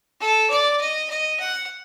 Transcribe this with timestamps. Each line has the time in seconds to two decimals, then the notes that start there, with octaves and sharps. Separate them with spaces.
0.21 A4
0.50 D5
0.81 D#5
1.10 D#5
1.40 F#5